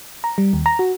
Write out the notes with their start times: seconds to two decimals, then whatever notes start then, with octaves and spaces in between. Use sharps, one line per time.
0.24 A#5
0.38 G3
0.53 D#2
0.66 A#5
0.79 F#4